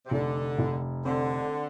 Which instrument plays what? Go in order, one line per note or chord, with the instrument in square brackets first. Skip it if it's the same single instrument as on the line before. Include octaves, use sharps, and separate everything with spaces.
[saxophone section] C3
[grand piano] F1 [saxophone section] D3
[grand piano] F1
[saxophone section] D3 [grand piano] C4